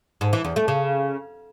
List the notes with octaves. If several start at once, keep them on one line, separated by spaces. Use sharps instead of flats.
G#2
E3
E2
A3
C#3